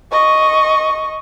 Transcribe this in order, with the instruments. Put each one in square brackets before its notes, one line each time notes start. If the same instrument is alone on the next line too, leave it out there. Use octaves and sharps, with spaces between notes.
[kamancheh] D#5 C#6